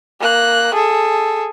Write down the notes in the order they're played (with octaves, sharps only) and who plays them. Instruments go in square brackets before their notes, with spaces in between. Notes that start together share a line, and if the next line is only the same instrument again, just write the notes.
[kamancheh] A#3 F#6
G#4 A4